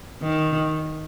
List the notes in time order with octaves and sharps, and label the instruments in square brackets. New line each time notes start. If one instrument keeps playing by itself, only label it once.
[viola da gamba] D#3